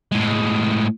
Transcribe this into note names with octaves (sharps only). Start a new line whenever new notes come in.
A2 G#3